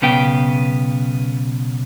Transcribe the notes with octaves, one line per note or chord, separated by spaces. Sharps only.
B1 C#3 B3 G5